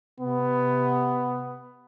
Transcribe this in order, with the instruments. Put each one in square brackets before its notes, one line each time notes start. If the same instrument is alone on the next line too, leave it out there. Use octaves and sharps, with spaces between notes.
[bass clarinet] C3 [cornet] B3